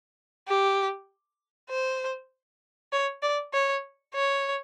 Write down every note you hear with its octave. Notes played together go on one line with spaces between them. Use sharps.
G4
C5
C#5
D5
C#5
C#5